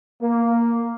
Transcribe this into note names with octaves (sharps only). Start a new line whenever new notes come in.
A#3